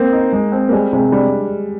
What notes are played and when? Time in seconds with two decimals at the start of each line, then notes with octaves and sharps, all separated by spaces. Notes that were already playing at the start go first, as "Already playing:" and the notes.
Already playing: A#3 C4
0.12 D#4
0.32 G#3
0.52 C4
0.69 A#3
0.72 G3 G#3
0.93 C3 G#3
1.12 G3 D4